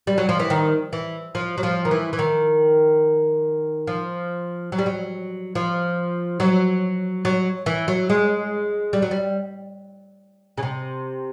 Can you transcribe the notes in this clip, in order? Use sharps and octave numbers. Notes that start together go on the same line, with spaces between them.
G3
F#3
F3
E3
D#3
E3
F3
F#3
F3
D#3
E3
E3
D#3
F3
F#3
G3
F#3
F3
F#3
F#3
E3
F#3
G#3
G3
F#3
G3
C#3
C3